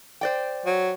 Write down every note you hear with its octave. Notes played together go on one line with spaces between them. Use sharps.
C5 D5 G5
F#3